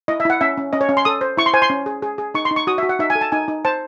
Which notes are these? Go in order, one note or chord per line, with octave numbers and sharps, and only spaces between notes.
E4 D#5
E5
E4 F#5
C#4 E5
C#4
C#4 D#5
C#5
C#4
C6
A4 D#6
C5
E4 C#6
C6
C5 G#5
C6
C#4
G#4
G#4
G#4
D#4 C#6
C6
D#4
C#6
F#4 D#6
F#4 E5
F#5
D#4 E5
G#5
A4
A5
D#4 G#5
D#4
C5 A5